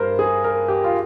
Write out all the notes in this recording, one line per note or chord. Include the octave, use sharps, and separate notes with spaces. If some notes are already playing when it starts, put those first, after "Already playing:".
Already playing: G2 A#4 C5
G#4
A#4
G4
F4